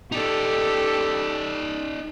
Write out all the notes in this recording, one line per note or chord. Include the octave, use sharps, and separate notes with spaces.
D#4 G4 A4 D5